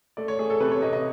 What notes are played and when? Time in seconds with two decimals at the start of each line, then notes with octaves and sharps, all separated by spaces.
0.17 A3 D5
0.28 C#5
0.39 A3 G#4
0.50 A4
0.60 C3 B4
0.72 C#5
0.82 C3 D#5
0.93 D#5